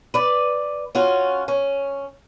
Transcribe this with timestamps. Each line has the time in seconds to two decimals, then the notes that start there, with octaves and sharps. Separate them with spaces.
0.14 B4 D5
0.95 C#4 F4 F#4
1.48 C#4